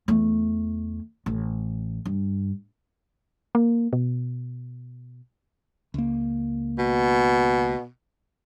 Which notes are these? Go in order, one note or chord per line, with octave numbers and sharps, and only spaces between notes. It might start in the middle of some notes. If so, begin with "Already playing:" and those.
E2 A3
A1
G2
A#3
B2
C#2 A#3
B2